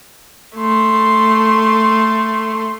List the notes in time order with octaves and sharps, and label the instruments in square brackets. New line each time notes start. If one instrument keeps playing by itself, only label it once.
[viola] A3 C6